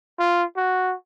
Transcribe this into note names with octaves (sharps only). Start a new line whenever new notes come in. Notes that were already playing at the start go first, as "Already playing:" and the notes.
F4
F#4